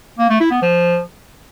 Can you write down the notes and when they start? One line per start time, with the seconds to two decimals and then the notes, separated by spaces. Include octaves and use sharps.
0.19 A#3
0.29 A3
0.40 E4
0.51 B3
0.62 F3